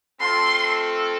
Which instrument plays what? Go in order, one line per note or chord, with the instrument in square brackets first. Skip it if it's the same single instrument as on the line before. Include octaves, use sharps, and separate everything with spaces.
[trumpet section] A3 C4 F4 A4 [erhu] C6